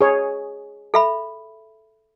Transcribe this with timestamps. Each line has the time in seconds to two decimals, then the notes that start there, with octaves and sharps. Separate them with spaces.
0.01 G#4 C#5
0.94 A4 E5 B5